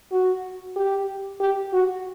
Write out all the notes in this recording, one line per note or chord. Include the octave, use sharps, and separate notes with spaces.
F#4
G4
G4
F#4